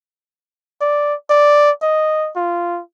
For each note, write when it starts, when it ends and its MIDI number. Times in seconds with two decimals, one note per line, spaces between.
0.81 1.14 74
1.30 1.71 74
1.82 2.30 75
2.36 2.80 65